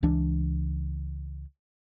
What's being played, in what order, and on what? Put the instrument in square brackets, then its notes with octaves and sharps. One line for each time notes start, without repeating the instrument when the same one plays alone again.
[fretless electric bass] C#2 E3 D4